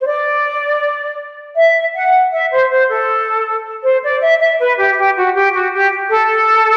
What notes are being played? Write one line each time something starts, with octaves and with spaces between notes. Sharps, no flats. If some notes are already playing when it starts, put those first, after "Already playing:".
C5
D5
E5
F#5
E5
C5
C5
A4
C5
D5
E5
E5
B4
G4
G4
F#4
G4
F#4
G4
A4